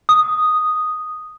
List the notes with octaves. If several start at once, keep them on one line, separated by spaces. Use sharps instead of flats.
D#6